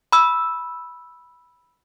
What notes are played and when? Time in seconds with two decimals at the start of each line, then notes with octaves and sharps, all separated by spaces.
0.12 B5 E6